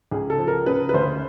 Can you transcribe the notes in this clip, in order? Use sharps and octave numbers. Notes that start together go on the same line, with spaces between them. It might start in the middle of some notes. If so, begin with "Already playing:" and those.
C#2 G#4
A4
F3
A#4
C#3 B4
B4
D2 C5